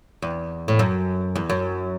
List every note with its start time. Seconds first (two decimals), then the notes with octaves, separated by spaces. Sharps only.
0.22 E2
0.68 A2
0.79 F#2
1.35 E2
1.50 F#2